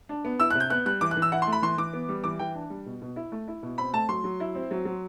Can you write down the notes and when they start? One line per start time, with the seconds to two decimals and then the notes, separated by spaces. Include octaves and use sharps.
0.09 D4
0.25 B3
0.40 E4 E6
0.50 F#6
0.55 C3
0.60 G6
0.70 B3 F#6
0.86 G3 F#6
1.01 E3 D6
1.11 F#6
1.17 E3
1.22 E6
1.32 E4 F#5
1.42 C6
1.47 A3
1.52 B5
1.62 E3 C6
1.78 E3 D6
1.93 B3
2.09 G3
2.24 E3 D6
2.39 E3 G5
2.55 D4
2.70 G3
2.86 B2
3.01 B2
3.16 E4
3.32 A3
3.48 E4
3.63 B2
3.78 C4 B5
3.93 A3 A5
4.09 F#3 C6
4.24 F#3
4.40 E4
4.55 C4
4.71 F#3
4.85 F#3